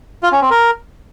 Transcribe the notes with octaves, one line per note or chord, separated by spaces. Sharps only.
F4
C#4
C4
A#4